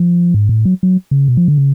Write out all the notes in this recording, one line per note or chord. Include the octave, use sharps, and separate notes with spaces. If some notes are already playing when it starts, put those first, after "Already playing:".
Already playing: F3
G#2
A2
F#3
F#3
C#3
B2
F3
D3
C#3